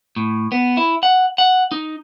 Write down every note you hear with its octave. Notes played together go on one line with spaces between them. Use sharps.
A2
B3
E4
F#5
F#5
D#4